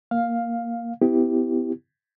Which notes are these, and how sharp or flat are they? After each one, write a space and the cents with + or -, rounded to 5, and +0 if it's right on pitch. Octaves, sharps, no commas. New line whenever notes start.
A#3 +0 F5 +5
B3 +40 E4 +0 G4 +0